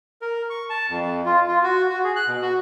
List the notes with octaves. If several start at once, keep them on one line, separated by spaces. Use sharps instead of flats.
A#4
C#6
A5
F2
F4
F4
F#4
F#4
G#4
F#6
B2
F#4